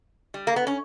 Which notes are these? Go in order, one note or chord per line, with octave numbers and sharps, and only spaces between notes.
G3
A#3
B3
C#4